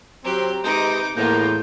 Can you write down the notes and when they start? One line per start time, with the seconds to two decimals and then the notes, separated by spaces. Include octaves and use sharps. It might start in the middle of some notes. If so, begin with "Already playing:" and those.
0.25 F#3 C4 G4 A#5
0.64 C3 G#3 D#4 B4 D6 G6
1.17 E2 A2 A#3 B3 F4 G6